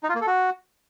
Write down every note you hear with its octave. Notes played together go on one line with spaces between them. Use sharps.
D#4
F4
A#3
A4
F#4